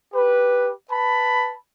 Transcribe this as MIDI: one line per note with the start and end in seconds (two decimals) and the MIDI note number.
0.13 0.71 67
0.13 0.71 71
0.91 1.55 71
0.91 1.55 81
0.91 1.55 83